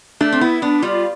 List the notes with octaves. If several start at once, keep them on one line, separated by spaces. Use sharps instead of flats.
A3 D4
C4
B3 E4
B3 D4
G3 F4